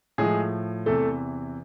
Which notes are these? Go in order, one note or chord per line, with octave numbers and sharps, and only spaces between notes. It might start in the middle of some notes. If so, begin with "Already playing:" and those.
A2 F3 G#3 G#4
E2 C3 E3 A3 A4